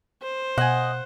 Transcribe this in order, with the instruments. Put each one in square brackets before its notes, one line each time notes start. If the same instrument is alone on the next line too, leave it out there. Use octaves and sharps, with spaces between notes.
[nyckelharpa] C5
[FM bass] B2 [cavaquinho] D#5 G#5 [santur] F#5